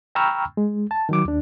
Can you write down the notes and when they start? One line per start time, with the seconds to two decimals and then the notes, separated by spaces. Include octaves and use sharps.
0.15 G5 A#5 B5 C#6 E6 F6
0.57 G#3
0.91 A5
1.09 D#3 F#3 D6
1.25 D#2 D4